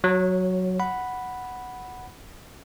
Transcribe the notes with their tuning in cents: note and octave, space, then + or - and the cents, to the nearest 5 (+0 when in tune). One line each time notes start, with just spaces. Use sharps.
F#3 +0 C#5 -30
F#5 +0 B5 +0